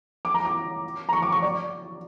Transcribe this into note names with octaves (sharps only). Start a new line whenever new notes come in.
D6
A#5
D6
A#5
C#6
D6
C#6
D5